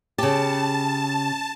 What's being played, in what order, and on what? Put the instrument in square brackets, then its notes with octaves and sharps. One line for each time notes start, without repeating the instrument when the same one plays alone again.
[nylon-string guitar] C#3 G4 [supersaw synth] A5